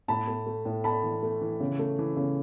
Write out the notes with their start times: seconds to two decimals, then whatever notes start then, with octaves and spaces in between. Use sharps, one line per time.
0.08 A2 A5 B5
0.27 A3
0.46 A3
0.65 A2
0.84 A3 A5 B5
1.03 E3
1.23 A3
1.41 E3
1.60 C#3
1.79 A3
1.99 E3
2.16 C#3